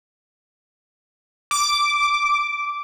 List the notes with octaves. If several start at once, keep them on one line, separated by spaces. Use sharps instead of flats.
D6